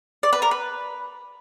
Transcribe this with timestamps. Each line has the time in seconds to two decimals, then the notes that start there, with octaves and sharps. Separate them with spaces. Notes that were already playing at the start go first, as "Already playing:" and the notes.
0.23 D5
0.33 B4
0.42 A#4
0.51 B4